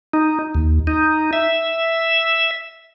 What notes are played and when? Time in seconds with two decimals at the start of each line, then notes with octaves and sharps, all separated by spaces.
0.13 D#4
0.54 D#2
0.87 D#4
1.33 E5